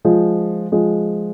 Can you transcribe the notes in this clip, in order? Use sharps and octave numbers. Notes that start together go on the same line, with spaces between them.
F3 G#3
F3 G#3